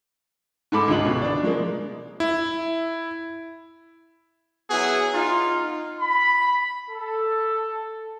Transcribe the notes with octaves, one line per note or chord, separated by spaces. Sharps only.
G#2 G#3 A4 B5 D6
C#2 D3 D#3 F4 D#5 F#7
B2 E3
D4 D5
F3 G#3 A#3
E4
F#3 B3 E4 F#4 G#4
D#4 F4
B5
A4